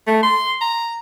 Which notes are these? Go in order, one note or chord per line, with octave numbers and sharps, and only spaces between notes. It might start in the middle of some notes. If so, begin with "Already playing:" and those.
A3
C6
A#5